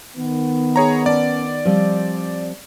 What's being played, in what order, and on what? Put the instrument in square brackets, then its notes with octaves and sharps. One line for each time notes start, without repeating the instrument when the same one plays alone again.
[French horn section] D#3 B3
[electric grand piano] G#4 C#5 A#5
[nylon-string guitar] C#4 A5 [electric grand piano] D5
[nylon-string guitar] F3 G3 C4